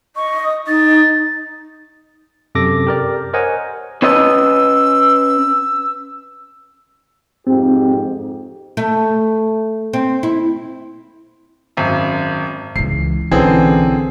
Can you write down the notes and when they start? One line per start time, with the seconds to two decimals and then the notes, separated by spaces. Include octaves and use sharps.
0.16 D#5 C#6
0.44 D#6
0.67 D#4 A6
2.55 F#2 C3 A4 D6 A#6
2.87 G4 A#4 D5
3.33 A#4 C5 C#5 D#5 F#5 G#5
4.02 C#4 B4 D#5 E6
7.47 F2 G#2 C4 G4
8.77 A3
9.93 C4
10.23 E4
11.77 G#1 F#2
12.76 C#2 E3 C7
13.31 B1 D3 E3 C4 C#4 G#4